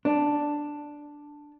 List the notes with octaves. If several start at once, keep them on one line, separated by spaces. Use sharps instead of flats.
D4